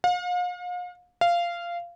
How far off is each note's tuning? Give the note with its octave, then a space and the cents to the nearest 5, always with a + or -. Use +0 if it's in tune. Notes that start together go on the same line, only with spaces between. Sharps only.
F5 +40
F5 -15